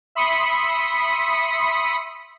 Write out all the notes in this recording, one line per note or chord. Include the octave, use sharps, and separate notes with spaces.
E5 B5 C6 D#6 B6 C#7